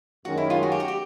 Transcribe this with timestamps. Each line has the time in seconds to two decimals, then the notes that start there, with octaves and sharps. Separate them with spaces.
0.25 F#2 D#3 G#3 C#4 F#4
0.38 E4
0.50 F4
0.63 F#4
0.72 G4
0.80 F#4
0.88 G4